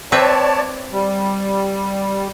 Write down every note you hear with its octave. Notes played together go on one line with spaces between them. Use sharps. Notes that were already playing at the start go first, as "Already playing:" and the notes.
C4 B4 C#5 D5 E5 A5
G3